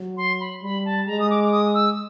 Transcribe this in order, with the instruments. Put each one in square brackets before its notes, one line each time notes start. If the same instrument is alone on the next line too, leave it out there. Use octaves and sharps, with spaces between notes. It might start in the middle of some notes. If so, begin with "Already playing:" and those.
Already playing: [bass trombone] F#3
[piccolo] C6
B5
[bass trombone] G3 [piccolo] B5
[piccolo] A5
[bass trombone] G#3 [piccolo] A#5
[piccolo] D#6
D6
D6
D#6
E6